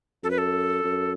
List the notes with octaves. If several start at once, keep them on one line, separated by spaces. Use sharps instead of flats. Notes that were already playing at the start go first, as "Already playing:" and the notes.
F#2 A4
B4
A4
F#2